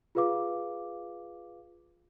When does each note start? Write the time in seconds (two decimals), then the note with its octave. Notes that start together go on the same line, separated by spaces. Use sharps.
0.15 F4 G#4 B4 F5 D6